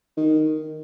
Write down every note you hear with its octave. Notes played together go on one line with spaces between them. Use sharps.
D#3